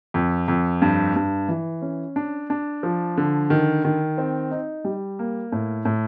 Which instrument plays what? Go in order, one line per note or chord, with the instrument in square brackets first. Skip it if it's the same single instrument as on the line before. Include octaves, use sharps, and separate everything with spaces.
[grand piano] F2
F2
G2
G2
E3
C#4
D4
D4
F3
D3
D#3
D#3
C4
D#4
G3
A#3
A2
A2